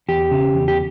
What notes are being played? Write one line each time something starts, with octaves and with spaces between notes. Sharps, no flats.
E2 G4
C#3
E2
G4